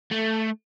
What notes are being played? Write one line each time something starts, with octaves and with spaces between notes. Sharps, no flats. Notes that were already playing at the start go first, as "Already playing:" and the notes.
A3